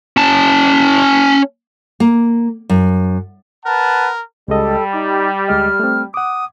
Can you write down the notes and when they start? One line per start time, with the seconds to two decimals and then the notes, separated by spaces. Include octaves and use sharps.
0.17 C#4 A5
2.00 A#3
2.70 F#2
3.66 A#4 B4 F#5 A5
4.48 C#2 G3 G#3 A4 D#5
4.93 D#4 D6
5.48 D2 G#3 D#5 F6
5.80 A3 C4
6.14 F#5 D6 D#6